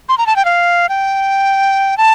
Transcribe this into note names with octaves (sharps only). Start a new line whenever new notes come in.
C6
A#5
A5
G5
F5
G5
A5